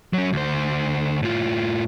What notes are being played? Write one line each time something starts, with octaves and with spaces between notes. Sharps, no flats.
F#3 C#4
D2 C5
A2 F4